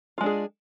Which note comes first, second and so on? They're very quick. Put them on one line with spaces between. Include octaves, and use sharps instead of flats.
F4 G#3 D4 G#4